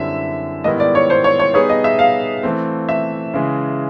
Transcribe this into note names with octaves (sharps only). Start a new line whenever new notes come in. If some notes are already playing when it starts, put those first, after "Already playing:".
Already playing: F#2 D3 G3 C4 E4 E5
G#2 D#3 G3 B3 E4 D#5
D5
C#5
C5
C#5
C#5
G3 B3 D#4 G#4 B4 C#5
D#5
E5
F5
E3 A3 C4
E5
C#3 E3 G#3